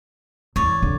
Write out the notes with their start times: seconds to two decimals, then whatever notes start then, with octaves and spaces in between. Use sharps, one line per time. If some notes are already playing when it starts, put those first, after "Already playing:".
0.56 E2 C#5 D5
0.82 D3